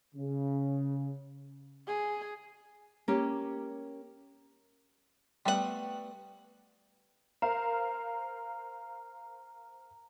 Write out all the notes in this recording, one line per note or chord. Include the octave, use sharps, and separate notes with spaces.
C#3
G#4
A#3 C#4 G4
G3 A3 B3 E4 F#5
A#4 C5 F5 A#5